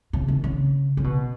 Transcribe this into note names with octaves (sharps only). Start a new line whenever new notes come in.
C#3
D#3
C#3
C#3
B2